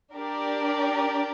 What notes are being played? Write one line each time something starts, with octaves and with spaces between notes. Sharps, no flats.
D4 G4 A#4 D5